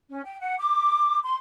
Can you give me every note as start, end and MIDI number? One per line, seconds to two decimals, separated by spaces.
0.11 0.21 61
0.24 0.39 79
0.40 0.54 78
0.58 1.18 86
1.22 1.35 84